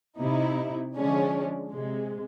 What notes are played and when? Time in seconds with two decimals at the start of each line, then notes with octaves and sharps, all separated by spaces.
0.18 C3 D#4 E4
0.95 D3 F3 G#3 C#4 D4
1.71 C3 G#3